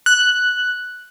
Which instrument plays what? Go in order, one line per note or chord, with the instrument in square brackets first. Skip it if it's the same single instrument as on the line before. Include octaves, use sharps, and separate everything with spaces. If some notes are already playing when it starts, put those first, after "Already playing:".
[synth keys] F#6